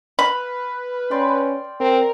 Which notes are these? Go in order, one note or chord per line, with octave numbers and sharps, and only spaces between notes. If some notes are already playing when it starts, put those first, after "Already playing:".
B4 F5 B5
C#4 D5 G5 C6
C4 A#4